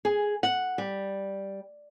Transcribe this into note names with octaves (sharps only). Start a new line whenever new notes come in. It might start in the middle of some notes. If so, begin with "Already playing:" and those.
G#4
F#5
G3